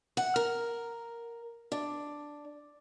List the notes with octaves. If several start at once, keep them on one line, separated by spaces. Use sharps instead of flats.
F#5
A#4
D4